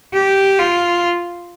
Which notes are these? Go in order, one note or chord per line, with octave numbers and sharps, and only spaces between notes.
G4
F4